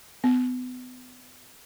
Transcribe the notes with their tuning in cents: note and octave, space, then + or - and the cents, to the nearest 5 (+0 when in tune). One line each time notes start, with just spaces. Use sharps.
B3 +30